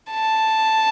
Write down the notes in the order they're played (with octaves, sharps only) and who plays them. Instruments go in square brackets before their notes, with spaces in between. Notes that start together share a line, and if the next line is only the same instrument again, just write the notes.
[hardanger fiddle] A5